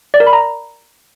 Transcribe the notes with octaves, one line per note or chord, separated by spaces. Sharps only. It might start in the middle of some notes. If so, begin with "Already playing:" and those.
D5
A#4
B5
A#5